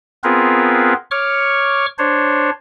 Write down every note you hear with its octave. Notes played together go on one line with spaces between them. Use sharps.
B3 C4 F4 G#4 A#4 B4
C#5 C#6 D6 F6
D4 C5 C#5